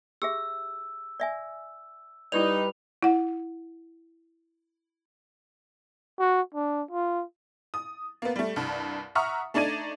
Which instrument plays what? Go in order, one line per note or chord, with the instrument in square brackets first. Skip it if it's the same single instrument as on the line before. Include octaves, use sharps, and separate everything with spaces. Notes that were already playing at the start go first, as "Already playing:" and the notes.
[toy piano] G4 G#4 E5 [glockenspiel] E6
[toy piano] D5 E5 G#5
[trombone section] G3 B4 [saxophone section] D#4 [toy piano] E4 G4 D5 [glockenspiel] F7
[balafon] E4 F#5
[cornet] F#4
D4
F4
[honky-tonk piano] D#6
A#3 B3
G3 A3
C2 G2
E5 F#5 A#5 C#6 D#6 F6
A3 D4 D#4 D5 G#6 D#7